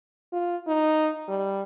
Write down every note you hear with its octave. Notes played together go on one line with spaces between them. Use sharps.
F4
D#4
G3